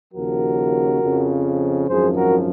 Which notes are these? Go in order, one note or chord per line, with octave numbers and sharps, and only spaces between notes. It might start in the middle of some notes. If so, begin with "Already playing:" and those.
D#2 C#3 F3 F#4 A#4
F2 C#3 F3
G#1 F#2 F3 G#4 C5
F#4 A#4